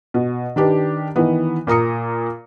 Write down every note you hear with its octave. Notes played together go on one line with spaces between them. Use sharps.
B2
D#3 D4 G4 B4
D#3 E3 B3
A#2 A#4 A#5 D#6 C#7